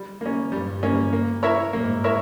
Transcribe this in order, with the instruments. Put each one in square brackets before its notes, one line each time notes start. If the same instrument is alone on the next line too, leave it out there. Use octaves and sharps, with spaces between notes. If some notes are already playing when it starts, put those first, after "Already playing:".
Already playing: [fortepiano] G3
A#3 C#4
[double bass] G2 [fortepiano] G3
[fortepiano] A#3 C#4
A#3
E4 A#4 C#5 E5
[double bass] G#2 [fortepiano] A#3
[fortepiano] E4 A#4 C#5 E5